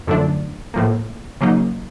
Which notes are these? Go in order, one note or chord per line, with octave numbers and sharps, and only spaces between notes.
F#2 D3 F3 A3 D4
A2 F3 A#3
C#3 F#3 A#3 D#4